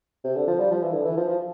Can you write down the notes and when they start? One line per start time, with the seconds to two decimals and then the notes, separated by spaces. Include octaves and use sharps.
0.24 C3
0.36 D3
0.47 F3
0.59 G3
0.71 F3
0.82 E3
0.94 D3
1.05 E3
1.17 F3
1.28 F3